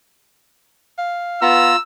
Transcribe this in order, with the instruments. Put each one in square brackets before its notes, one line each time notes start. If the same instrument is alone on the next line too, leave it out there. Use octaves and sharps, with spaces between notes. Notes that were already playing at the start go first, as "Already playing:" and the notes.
[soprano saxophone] F5
[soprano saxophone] B3 [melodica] F4 A#5 [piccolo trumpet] E6